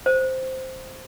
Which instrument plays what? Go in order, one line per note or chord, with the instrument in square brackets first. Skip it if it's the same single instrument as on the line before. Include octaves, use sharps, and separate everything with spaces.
[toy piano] C5